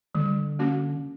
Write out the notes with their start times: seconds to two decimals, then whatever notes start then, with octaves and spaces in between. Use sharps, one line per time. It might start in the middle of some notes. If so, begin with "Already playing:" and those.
0.15 D3 G3
0.59 A#3 C#4 F#4